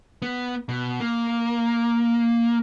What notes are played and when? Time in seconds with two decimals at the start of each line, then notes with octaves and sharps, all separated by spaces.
0.22 B3
0.69 B2
1.00 A#3